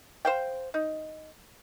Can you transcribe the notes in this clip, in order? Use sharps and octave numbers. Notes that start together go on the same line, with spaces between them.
C5 F5 G5
D#4